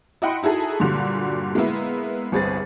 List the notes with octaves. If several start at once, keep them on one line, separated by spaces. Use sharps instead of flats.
E4 D#5 F#5 G5 B5 C6
D#4 E4 F#4 G#4 A4
G2 A#2 D3 F#3 G3
G#3 A#3 B3 E4
G1 C2 C4 G#4 B4 A6